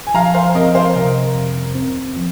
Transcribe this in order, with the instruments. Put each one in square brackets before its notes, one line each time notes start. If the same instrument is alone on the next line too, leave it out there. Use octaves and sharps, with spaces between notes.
[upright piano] G#5
[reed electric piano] F3 [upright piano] F5 A#5
[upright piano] C5 F5
[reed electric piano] C4 [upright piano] A#4 D#5
[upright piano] C5 F5
[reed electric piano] C3 [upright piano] A#4
[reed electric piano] F2
C4
F3